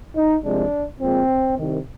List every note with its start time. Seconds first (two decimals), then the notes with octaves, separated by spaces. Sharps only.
0.16 D#4
0.44 C2 C3 F3 G#3 D4
1.01 A#2 F3 G#3 C4
1.58 C2 C3 D#3